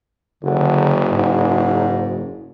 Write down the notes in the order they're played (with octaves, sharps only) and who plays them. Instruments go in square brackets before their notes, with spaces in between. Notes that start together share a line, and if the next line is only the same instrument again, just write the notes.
[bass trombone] F#1 [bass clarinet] D3
[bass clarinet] G#2